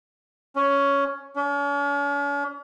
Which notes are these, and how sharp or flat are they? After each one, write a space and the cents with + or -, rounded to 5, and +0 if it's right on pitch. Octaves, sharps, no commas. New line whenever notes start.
C#4 +10
C#4 +45